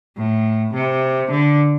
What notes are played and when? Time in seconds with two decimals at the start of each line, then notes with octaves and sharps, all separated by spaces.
0.17 A2
0.74 C3
1.31 D3